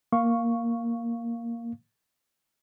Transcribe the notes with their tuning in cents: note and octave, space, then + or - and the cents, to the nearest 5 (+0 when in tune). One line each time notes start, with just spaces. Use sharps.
A#3 +0 F5 +0 C#6 +0